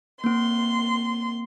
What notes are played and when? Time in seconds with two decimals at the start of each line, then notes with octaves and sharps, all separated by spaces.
0.24 A#3 C4 C6